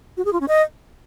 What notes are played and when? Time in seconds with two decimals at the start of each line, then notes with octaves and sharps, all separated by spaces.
0.17 F#4
0.25 G#4
0.33 F4
0.40 C#4
0.48 D#5